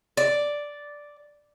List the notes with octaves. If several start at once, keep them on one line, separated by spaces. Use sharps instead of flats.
D5